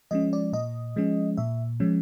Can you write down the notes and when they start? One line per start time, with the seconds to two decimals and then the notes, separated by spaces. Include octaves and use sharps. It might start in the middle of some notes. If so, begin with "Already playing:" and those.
0.11 F3 G#3 C#4 D#5
0.33 D5
0.53 A#2 D#5
0.96 F3 G#3 C#4
1.37 A#2 E5
1.80 F3 G#3 C#4